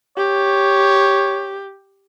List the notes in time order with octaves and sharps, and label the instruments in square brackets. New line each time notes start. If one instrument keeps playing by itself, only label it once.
[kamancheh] G4 [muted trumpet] C#5